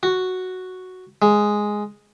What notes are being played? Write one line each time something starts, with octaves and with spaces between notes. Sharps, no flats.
F#4
G#3